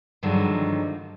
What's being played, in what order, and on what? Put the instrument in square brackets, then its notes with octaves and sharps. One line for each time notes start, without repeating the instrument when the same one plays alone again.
[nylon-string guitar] G2 D3 D#3 F3 F#3 G#3